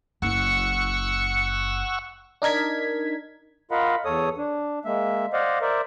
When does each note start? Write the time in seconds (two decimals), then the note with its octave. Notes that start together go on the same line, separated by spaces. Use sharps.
0.22 F#1 E4 F#5 C#6 E6 C#7
2.42 D4 D#4 A#4 G#6 B6
3.71 F4 A#4 D#5 F5 F#5 B5
4.05 E2 A4 C#5 D#6
4.38 D4
4.85 G#3 A#3 E5
5.33 C5 D5 D#5 F5 F#5
5.62 A#4 C5 D5 E5